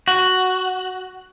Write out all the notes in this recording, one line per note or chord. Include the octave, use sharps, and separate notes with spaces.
F#4